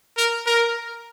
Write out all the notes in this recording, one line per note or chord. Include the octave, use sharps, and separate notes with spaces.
A#4
A#4